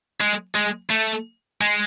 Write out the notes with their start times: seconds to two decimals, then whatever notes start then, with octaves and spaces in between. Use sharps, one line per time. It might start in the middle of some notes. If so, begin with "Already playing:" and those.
0.20 G#3
0.55 G#3
0.90 A3
1.61 G#3